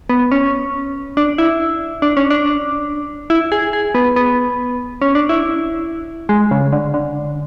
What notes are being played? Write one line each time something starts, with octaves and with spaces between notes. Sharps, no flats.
B3
C#4
D4
E4
D4
C#4
D4
E4
G#4
G#4
B3
B3
C#4
D4
E4
G#3
C#3
D3
D3